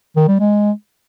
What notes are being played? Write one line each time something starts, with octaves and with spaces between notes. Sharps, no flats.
D#3
G3
G#3